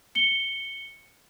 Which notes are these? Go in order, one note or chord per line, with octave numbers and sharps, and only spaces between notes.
C#7 G7